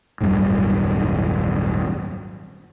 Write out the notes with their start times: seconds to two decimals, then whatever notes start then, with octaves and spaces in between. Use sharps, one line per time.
0.21 D#1 G#1 F#2 G3